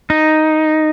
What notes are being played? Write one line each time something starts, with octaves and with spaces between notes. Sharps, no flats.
D#4